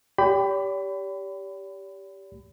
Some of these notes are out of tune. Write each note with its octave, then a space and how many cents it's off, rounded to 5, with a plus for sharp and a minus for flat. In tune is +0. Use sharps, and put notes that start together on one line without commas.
G4 +0 D5 -45 B5 +25